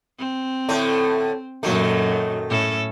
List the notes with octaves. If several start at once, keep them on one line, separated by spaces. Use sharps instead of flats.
C4
A2 D3 A3
F#2 A#2 D#3 F#3 A3
A2 C#4 A4